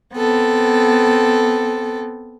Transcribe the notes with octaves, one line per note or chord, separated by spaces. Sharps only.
B3 C4 A4